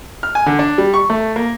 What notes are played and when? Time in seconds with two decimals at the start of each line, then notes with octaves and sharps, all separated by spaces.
0.23 F6
0.35 G#5
0.46 D3
0.59 D4
0.78 G3
0.94 C#6
1.10 A3
1.36 A#3